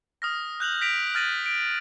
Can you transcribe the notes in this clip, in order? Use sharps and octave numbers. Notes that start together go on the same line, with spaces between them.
D#6 F6 A#6
F#6 G6 F7 F#7
A#6 B6 D7 F7
F6 G6 A6 A#6 D#7 F#7
D7